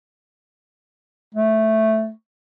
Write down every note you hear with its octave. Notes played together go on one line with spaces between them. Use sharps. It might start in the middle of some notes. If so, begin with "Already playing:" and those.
A3